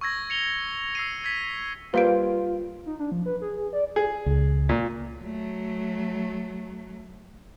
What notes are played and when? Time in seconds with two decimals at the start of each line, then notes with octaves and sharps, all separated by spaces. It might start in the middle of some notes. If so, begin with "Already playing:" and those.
0.01 C#6 E6 G#6 A#6
0.30 C#7 F7 G7
0.95 E6 C7 D#7
1.24 G#6 B6
1.94 G3 A#3 F4 B4 C5 F5 D7
2.86 D#4
2.99 D4
3.12 F3
3.26 B4
3.41 G#4
3.57 G#4
3.73 D5
3.96 G#4
4.26 C#2
4.69 A#2
5.20 F#3 A3